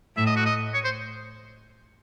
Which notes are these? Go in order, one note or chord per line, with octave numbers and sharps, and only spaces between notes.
A2 E5
D#5
F#4
D#5
C#5
C5